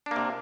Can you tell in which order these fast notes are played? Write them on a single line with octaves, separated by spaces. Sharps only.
D4 A#3 C3